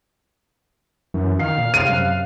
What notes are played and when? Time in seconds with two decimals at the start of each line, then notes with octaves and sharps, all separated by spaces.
1.14 F#2 E3
1.39 D#3 F5 C7
1.58 A#2
1.74 C3 D#7
1.89 F#2 F#6